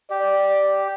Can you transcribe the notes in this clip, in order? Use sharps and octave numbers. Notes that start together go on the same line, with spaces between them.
G4 D5